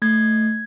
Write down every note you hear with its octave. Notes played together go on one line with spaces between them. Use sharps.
A3 G#6